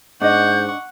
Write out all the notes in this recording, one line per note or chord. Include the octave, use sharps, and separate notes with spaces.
G#2 D4 D#5 F#5 C#6 G6